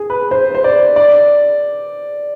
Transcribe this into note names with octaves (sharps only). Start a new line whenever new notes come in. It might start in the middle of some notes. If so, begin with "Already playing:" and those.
Already playing: G#4
B4
C5
C5
D5
D5